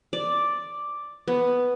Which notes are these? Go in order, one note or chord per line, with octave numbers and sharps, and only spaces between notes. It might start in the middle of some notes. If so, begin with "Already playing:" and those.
D5
B3